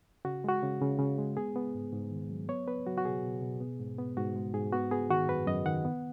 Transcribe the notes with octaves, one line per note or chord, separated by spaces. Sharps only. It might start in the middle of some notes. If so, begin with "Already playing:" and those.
C#3 F#4
G#3 F#4
C#3
C#3
C#3
G#3
B3 G#4
B3
G#2
G#2
D#3
F#3
B3 C#5
B3 B4
F#3 F#4
F#4
B2 G#4
B2
B2
B3
G#2
B3
G#2 F#4
G#3
G#2 G#4
B3 F#4
B3 G#4
D#3 F#4
F#2 B4
F#2 D#5
D#3 F#5
B3